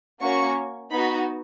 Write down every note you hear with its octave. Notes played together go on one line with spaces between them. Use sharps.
A#3 C#4 F#4 C#6
B3 D#4 F#4 B5